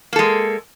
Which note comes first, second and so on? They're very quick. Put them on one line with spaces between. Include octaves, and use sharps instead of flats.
A#3 A4 G#3